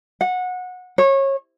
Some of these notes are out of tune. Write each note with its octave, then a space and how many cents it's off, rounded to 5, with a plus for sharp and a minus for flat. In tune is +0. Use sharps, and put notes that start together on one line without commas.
F#5 -20
C#5 -25